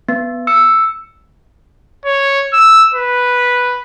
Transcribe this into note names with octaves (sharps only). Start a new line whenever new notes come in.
B3
E6 C#7
C#5
E6
B4